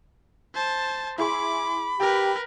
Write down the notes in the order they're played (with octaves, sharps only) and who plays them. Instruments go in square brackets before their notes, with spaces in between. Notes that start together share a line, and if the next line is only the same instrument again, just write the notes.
[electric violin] C5 A5
[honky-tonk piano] E4 G#4 C6 [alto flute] B5 [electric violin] D6
[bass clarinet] G4 [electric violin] A#4 B4 [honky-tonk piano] G5